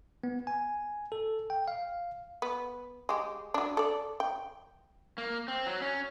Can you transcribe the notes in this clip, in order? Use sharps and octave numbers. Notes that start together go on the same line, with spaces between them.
B3
G#5
A4
G5
F5
B3
G#3 G4
F#3 D4
A4 D5
G5
A#3
C4
F#3
C#4